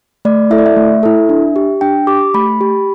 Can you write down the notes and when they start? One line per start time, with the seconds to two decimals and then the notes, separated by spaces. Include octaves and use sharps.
0.25 A3 D5
0.50 E4 A4 E5
0.58 D5
0.66 E5
0.76 A3
1.03 E4 A4
1.29 D4
1.56 G4
1.81 D4 G5
2.07 G4 D6
2.34 A3 B5
2.61 G4